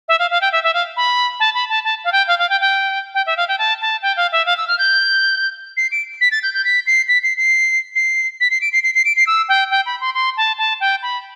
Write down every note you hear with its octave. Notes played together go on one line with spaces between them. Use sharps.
E5
F5
F5
G5
E5
E5
F5
B5
A5
B5
A5
A5
F5
G5
F5
F5
G5
G5
G5
E5
F5
G5
A5
A5
G5
F5
E5
F5
E6
F6
G6
C7
D7
B6
A6
G6
G6
B6
C7
B6
C7
C7
C7
B6
C7
D7
C7
C7
C7
D7
C7
E6
G5
G5
B5
C6
C6
A5
A5
G5
B5